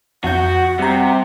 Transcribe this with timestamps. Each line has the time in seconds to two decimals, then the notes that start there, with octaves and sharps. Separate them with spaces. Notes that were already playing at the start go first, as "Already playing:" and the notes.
0.24 F2 F#4 F#5 G6
0.79 C3 G3 A#5